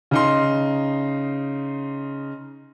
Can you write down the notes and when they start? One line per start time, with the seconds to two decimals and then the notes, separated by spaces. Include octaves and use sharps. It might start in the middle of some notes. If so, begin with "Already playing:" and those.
0.11 C#3 D#4 C6